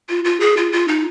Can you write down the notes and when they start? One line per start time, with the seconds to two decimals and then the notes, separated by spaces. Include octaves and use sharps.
0.09 F4
0.24 F4
0.40 G#4
0.57 F4
0.72 F4
0.88 D#4